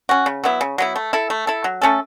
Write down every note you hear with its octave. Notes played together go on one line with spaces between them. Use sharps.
C#4 F#4
C#3
F#3 B3 E4
C#3
F#3 B3 E4
A3
E4 A4
A3
E4 A4
F#3
A3 C#4 A4